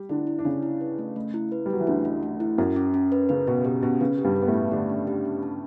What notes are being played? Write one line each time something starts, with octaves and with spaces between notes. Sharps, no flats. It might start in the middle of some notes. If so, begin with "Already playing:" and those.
Already playing: G3 G4
D3 D4 E4
E4
D4
C#3 C#4 E4
E4
B4
A3
A3
E4
B4
G3
F#3 B4
E3
D2 D3 E4
A3
A3
E4
F#2 F#3 C#4
C#4
C#4
B4
C#3 B4
B2 C#4
B2 G4
B2 C#4
C#3 B4
G4
G2 G3
B4
B3
A2 A3
C#4
D3 D4 G4
C#4
G4
C#4
A5